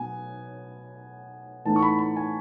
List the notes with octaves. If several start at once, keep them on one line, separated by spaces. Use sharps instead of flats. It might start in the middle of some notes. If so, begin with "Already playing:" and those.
Already playing: B2 F#3 B3 G#5
A2 E3 B3 D#4 A5
C#6
B5
B5
G#5